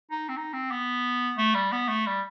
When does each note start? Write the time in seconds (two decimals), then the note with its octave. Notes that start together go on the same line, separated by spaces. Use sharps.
0.11 D#4
0.29 C4
0.37 D#4
0.53 C4
0.71 B3
1.38 A3
1.54 G3
1.72 B3
1.88 A3
2.06 G3